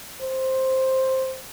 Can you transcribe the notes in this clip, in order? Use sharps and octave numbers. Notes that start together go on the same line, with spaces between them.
C5